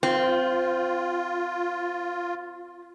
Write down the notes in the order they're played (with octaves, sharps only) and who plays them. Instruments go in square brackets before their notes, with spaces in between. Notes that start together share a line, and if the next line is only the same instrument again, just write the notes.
[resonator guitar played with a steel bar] C4 [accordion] F4